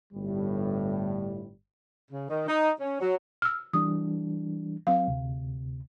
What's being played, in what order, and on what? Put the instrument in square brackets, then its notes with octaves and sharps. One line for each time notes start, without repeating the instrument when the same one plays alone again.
[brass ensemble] G1 A2 G3
[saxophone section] C#3
D#3
D#4
C#4
F#3
[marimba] E6 F6
[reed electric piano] E3 G3 D4 [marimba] D#6
[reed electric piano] F#3 C4 [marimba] F5
[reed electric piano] D2 C3